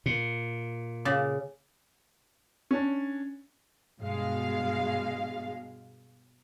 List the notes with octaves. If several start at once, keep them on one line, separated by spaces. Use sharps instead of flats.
A#2
C#3 D5
C#4 D4
G2 B2 G#3 F5